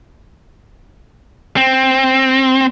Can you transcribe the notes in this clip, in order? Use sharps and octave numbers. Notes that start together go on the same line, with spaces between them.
C4